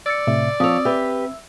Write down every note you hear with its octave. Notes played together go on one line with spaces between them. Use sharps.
D5 E6 A6 C#7
A2 C3 E5
F3 C4 C#5 D#6 E6
G4 B4 E5 E6